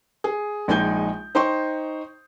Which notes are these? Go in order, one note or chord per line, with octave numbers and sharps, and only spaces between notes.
G#4
A#1 G#3 D#4 G#5 G6
D#4 C5 G5 C6 C#6